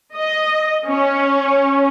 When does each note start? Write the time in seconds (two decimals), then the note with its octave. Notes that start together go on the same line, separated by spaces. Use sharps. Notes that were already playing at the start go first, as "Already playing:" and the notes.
0.15 D#5
0.86 C#4